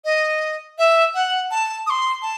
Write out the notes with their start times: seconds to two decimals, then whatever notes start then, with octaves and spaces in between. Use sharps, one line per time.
0.05 D#5
0.78 E5
1.15 F#5
1.51 A5
1.87 D#6
1.90 C6
2.22 A5